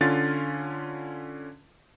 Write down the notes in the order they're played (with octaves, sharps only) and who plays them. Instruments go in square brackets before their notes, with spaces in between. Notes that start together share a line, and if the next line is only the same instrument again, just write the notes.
[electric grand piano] D3 C#4 F4 A6